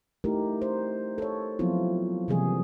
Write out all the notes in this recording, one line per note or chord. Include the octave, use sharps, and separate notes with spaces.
A3 D#4 E4 G4 A#4
C5
A4 C#5
F3 F#3 B3 C4 E4 F4
C3 E3 F3 G3 A#3 G#4